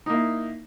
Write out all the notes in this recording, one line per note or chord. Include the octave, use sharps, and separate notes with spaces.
A#3 D#4 E4